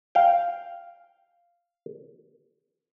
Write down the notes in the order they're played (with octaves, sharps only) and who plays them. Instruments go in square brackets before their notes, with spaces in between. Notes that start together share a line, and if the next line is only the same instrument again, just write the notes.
[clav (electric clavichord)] F5 G5